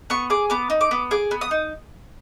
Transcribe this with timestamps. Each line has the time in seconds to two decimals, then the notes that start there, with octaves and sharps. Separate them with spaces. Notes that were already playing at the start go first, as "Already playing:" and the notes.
0.10 B3 C#6
0.30 G#4 D6
0.50 B3 D6
0.70 D#4
0.81 D6
0.91 B3
1.11 G#4 D6
1.31 B3
1.41 D#6
1.51 D#4